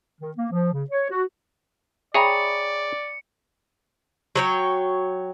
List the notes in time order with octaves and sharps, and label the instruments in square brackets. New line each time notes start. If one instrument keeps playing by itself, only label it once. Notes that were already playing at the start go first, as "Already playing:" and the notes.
[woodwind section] D#3
A#3
F3
C#3
C#5
F#4
[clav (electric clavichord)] G#4 C#5 A#5 [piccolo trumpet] D5 [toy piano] E5 G5 B5 [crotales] C#7
[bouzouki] F#3 C#5 G5